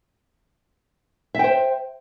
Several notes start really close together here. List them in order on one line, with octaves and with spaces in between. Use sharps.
E5 G5 C5